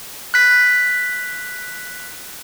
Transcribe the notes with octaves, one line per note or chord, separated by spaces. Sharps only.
F#6 B6